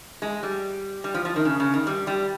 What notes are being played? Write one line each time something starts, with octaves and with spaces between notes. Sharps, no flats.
G#3
G3
G3
F3
F3
D#3
C#3
C#3
D#3
G3
G3